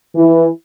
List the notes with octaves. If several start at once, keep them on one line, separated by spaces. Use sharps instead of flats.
E3